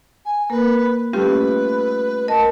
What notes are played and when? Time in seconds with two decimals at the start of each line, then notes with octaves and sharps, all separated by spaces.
0.25 G#5
0.50 A#3 A#4 B4
1.13 G3 A3 C#4 F4 G4 B4
2.28 A#4 D#5 A5